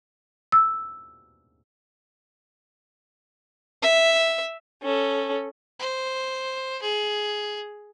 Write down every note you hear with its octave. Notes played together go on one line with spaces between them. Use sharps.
E6
E5
C#4 A4
C5
G#4